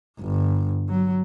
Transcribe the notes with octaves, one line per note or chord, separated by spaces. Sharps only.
G1
F#3